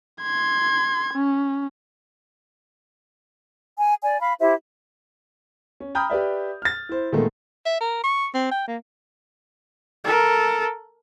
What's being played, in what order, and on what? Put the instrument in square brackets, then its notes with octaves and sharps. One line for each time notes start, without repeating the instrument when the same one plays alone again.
[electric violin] C6 G#6
C#4
[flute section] G#5
D5 G#5
F5 B5
E4 G4 C5 E5
[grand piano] C#4
G5 A#5 B5 D#6 F6 G6
G4 B4 D5 E5
F6 A6
E4 C5
A#2 D#3 G#3 A3 B3 A4
[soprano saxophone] E5
A#4
C#6
C4
G5
A#3
[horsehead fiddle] A4 A#4